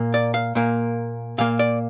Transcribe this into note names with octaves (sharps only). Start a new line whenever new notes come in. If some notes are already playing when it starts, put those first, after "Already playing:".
Already playing: A#2 A#3
D5
F5
A#2 A#3
A#2 A#3 F5
D5